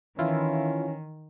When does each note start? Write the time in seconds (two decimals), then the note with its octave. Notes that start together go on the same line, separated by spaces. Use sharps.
0.19 D#3 E3 C#4 E4 F4